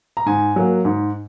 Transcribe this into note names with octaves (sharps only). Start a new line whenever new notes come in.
A#5
G#2 G#5
F#3 A#3
G#2